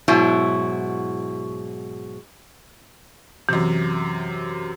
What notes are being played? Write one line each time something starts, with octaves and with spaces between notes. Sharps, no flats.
G#2 B2 F#3 E4
F#2 C3 E3